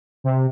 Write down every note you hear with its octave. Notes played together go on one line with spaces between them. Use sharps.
C3